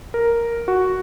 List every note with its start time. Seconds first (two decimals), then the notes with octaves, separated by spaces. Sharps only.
0.14 A#4
0.68 F#4